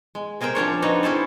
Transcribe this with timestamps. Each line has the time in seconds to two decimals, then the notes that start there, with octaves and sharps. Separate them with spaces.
0.15 G#3
0.41 C3 G#4 A#4 C5 G5
0.55 F3 C#4 D4 C#5
0.82 C4 D4 D#4 F#4 B4 C#5
1.03 C#4 E4 A4 C5